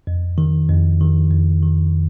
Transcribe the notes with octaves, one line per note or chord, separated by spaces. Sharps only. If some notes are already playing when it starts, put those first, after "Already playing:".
F2
D#3
F2
D#3
F2
D#3